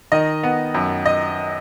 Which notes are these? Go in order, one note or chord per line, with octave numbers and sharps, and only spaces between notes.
D#3 D#5
B3
F#2
D#5